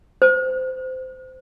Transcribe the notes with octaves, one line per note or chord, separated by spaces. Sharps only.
C5